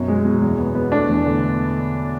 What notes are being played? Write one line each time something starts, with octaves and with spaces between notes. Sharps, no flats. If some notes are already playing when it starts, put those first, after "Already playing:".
Already playing: F#2 B2
G#3
B2
E2
B3
B3
A3 D4
E2
D3